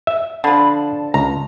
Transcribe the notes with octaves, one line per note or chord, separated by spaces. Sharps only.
E5
D3 F3 B5
A5
C#2 A#5